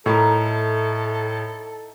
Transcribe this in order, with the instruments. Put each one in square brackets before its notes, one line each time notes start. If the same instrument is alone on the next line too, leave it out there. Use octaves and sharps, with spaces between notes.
[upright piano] A2 [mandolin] D#4 E4 A#4 [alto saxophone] A4